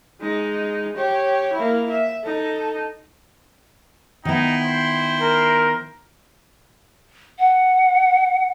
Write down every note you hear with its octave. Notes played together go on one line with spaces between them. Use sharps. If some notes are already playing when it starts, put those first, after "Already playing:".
G#3 D#4
G4 C#5
A#3 E4
E5
D#4 A4
D#3 B3 D#4 E4 G5
C5
A#4
F#5